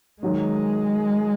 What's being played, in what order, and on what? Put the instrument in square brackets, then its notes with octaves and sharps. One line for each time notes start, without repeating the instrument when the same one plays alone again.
[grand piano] D#3 F#3 D#4 [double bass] G#3